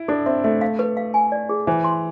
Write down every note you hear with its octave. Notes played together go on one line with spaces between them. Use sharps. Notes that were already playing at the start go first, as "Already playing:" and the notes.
Already playing: E4
D4 A4
C4 E5
A3 E5
F5
B4
F5
G#5
D5
G#4
E3 C5
C6